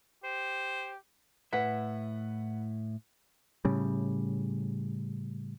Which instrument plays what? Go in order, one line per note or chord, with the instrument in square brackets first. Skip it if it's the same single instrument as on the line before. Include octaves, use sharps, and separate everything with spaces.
[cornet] G4 [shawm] C5
[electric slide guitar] A2 E4 E5 [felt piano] B4 F#5 B6
[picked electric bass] A2 C#3 G3